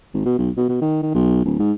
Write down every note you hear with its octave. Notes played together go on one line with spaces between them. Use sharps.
G#1
B2
B1
B2
B2
D#3
D#3
B1
D1
G#2